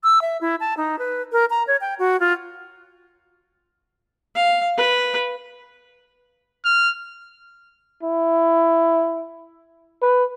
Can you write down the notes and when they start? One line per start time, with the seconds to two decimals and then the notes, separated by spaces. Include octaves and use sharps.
0.04 E6
0.22 E5
0.41 E4
0.60 A5
0.77 D#4
0.99 B4
1.32 A#4
1.50 A#5
1.67 C#5
1.81 G5
1.99 F#4
2.20 F4
4.35 F5
4.77 B4
6.65 F6
8.03 E4
10.02 B4